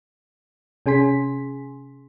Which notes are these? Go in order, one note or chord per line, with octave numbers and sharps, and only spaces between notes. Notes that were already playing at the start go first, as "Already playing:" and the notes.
C3 C#4 G#4 G#5 C6 B6